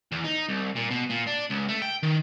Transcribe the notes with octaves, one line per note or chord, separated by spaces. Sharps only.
E2
D#4
C2
A#2
B2
A#2
D4
C#2
A3
G5
D#3